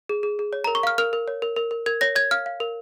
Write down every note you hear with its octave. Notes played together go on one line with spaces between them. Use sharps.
G#4
G#4
G#4
C#5
A#5
A#4
C#6
F5 F6
A#4 F6
A#4
C#5
A#4
A#4
A#4
A#4 G#6
C#5 A#6
C#5 G#6
F5 F6
F5
A#4